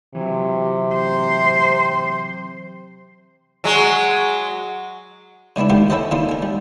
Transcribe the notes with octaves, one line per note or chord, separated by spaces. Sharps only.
C3 E3 F#3
C5
F#3 G#3
C#3 G#3 B3 D4 E4
D2 D#3 A#3 B3 G4 F5
C#4 E4 A4 B4 C5 D#5
D3 E3 A#3 B3 D#4 F4
A#4 G#5
G3